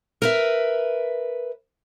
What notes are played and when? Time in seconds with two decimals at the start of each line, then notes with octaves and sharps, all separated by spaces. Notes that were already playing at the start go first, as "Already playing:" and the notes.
0.22 A#4 B4 E5